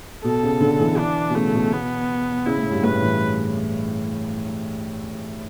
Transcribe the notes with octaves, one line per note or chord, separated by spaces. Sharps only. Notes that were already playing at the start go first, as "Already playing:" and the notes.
B2 A4
C#3
D3
E3
D4
B2
C#3 A3
B2
B3
C#3 E4
A2
G2
A2 B4
E3